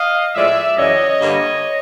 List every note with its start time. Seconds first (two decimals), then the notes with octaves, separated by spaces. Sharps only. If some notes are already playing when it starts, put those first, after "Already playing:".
Already playing: D#5 F5
0.35 A2 F3 G#3 D5 E5
0.77 F#2 C#3 E3 C#5 D#5
1.20 G2 D3 G3 A#3